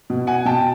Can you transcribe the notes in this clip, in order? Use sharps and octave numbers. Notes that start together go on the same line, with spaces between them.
B2
F#5 G#5
B2 G5 A5